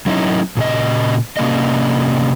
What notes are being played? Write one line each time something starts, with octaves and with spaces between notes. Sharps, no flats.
F#3 C#4 D#4 E4
A#2 C#3 D#5
C3 A#3 C#4 D4 D#5